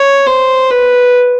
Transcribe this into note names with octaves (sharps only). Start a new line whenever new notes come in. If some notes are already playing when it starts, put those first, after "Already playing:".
Already playing: C#5
C5
B4